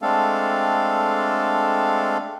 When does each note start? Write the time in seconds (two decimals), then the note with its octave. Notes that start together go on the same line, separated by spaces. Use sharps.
0.02 G#3 A3 C4 D4 A4 F5